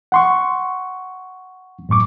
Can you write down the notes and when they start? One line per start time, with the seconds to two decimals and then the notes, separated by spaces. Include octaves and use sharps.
0.12 F#5 C6 C#6
1.89 F#2 A2 C#6 D6